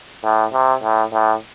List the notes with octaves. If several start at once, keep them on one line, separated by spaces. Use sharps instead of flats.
A2
C3
A2
A2